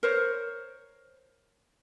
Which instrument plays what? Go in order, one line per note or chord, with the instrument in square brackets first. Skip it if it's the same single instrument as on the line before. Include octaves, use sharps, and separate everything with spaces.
[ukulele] A#4 C5 C#5